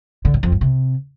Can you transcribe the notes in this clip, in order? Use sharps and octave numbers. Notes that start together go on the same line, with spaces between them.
D3
A2
F2
G2
C3